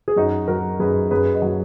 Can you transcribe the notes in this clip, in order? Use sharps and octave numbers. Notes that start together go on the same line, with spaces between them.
G#4
F#2 D#4 F#4
F#3 F#4 A#4
F#2 G#4 B4
F#2 G#4 B4
B4 D#5
F#3